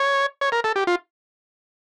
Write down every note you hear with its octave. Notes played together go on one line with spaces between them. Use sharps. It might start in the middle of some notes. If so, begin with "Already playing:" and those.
Already playing: C#5
C#5
A#4
A4
G4
F4